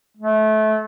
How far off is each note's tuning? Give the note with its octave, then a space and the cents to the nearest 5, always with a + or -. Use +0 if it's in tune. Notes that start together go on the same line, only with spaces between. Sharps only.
A3 -25